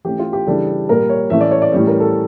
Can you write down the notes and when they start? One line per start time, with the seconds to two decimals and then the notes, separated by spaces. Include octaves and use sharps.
0.04 E3 A3 C#4 G4
0.19 F4
0.33 G4
0.46 C#3 E3 G3 D4 A4
0.89 A#2 G3 A#3 A#4
1.10 C#5
1.30 A2 E3 A3 C#4 E5
1.41 D5
1.51 C#5
1.62 D5
1.72 A2 E3 G3 C#4 C#5
1.87 A#4
2.00 A4